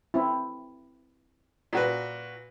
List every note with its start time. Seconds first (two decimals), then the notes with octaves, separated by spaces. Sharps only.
0.14 C4 E4
1.73 A#2 F#4 B4